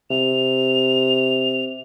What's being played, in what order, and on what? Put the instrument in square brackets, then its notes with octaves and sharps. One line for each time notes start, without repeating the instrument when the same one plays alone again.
[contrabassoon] C3 [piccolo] F7